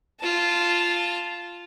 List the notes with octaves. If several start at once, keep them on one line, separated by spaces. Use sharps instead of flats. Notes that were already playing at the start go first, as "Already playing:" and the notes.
F4 A5